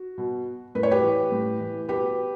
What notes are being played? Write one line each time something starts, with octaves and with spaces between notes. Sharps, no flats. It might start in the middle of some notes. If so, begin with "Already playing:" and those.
Already playing: F#4
B2
A2 B4
C#5
G4 B4
E3
A2
E3
B2 G4 B4